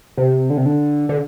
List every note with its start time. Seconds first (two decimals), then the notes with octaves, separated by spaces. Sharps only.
0.17 C3
0.50 D3
0.57 C3
0.66 D3
1.09 D3